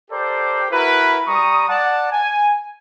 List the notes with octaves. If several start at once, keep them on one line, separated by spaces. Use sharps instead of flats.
G4 A4 A#4 C5 D5
E4 F#4 A#4 B4
G3 A#5 C#6 D#6
D5 F#5 A5
G#5